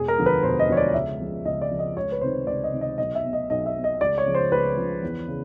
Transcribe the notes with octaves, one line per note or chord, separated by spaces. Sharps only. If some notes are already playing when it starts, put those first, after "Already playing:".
Already playing: E1 G#4
A#4
D2 D3 F3
B4
E1 C5
D#5
D2 D3 F3 C#5
D5
C#2 E5
C#3 F3
C#2 D#5
D5
C#3 F3
D#5
C#2 C#5
B4
C3 D#3 C5
C#2 D5
D#5
C3 D#3
D#5
B1 D#5
E5
B2
D#5
B1 D#5
E5
B2
D#5
C#2 D5
C#5
C#3 F3
C5
C#2 B4
C#3 F3
E2
C#3